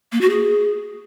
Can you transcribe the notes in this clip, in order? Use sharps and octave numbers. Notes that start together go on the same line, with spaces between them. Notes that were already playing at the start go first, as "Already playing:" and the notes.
A#3
F#4
G#4